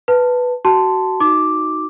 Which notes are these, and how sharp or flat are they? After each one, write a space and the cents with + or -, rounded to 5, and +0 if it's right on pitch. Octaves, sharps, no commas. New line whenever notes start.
B4 +0 A5 +15
F#4 +20 A5 +0 C6 -10
D#4 +0 F#4 +0 D6 +0